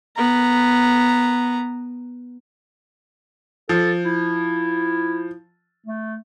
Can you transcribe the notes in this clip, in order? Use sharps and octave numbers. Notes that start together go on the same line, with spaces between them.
B3 A#5
F3 A4
E4
A3